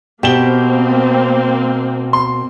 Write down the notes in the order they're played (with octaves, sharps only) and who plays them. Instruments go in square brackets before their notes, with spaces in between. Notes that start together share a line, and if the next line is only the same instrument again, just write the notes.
[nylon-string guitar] B2 [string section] A#3 C4 [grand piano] G4 E7 G7
[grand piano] C6